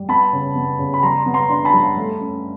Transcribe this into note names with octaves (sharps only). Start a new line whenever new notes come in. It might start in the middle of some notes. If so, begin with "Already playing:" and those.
Already playing: G3
B3 A5 B5
C#3
B3
C#3
B5
G3 A#5 C6
B3
A#5 C6
D4
A5 B5
G3
A3
C#4